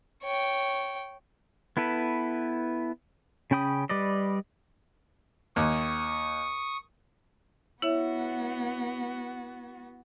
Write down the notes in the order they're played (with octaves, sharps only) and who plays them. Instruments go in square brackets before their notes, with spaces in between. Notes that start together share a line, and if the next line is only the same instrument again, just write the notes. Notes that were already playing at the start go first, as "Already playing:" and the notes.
[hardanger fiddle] C#5 G5
[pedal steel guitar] B3 E4 A4 B4
C#3 C#4 G5 B5 D#6
G3 B4 D5 D#5
[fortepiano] D#2 [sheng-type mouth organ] C#6 D#6
[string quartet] B3 F#4 [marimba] E4 C#5 E5